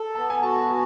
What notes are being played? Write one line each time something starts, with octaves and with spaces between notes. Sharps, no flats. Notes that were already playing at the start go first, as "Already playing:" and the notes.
Already playing: A4
B3 A5
G#5
F#4 A5
F#4 G#5